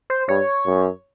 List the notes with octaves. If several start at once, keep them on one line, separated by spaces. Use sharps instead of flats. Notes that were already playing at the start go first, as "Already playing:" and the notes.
C5
G2 C#5
F#2